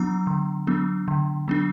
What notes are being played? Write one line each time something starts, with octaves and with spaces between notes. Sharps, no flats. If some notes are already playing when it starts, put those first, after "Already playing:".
Already playing: F#3 B3 D4 F#5 A#5
D3
F#3 B3 D4
D3
F#3 B3 D4